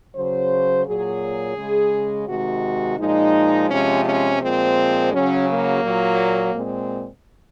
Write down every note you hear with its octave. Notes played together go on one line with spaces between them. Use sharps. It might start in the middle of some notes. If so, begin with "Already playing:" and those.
C#3 F#3 C5
A#2 F#3 G#4
C#3 G#3
C3 D#3 G#3 F#4
A#2 F3 G#3 D#4
C3 F3 G#3 C#4
C#4
A#2 F3 G#3 C4
C#3 F#3 C#4
A#3
A#2 F#3
A#2 G#3 C4